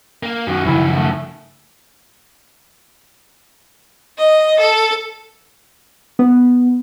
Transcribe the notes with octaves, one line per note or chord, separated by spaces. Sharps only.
A#3
F#2 D#3 F#4
C#3 F3 E4
A3
D#5
A4
B3